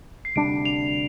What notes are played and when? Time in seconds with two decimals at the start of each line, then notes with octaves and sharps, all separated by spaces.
0.25 C7
0.36 D2 C3 G3 D4 D7
0.65 F7